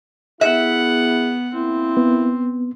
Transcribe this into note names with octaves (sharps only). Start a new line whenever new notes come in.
B3 E4 G#4 E5 F#5
A#3 C4 E4
B3